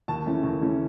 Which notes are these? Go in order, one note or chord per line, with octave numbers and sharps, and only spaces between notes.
D#2 A5
C#3 E3 A3 C#4
D#2
C#3 E3 A3 C#4